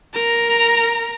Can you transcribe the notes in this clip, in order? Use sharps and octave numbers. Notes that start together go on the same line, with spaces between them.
A#4 A#5